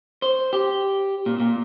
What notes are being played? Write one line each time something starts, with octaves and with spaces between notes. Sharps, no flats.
C5
G4
A#2
A#2